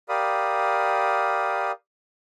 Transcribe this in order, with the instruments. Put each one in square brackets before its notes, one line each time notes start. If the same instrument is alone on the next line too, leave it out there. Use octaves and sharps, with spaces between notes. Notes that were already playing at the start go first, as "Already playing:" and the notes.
[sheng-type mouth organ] G4 A#4 D5 F5 B5 D#6